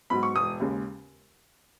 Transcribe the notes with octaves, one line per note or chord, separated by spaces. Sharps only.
G#2 F#3 B3 B5
C#6
E1 D#6
D#2 C#3 G#3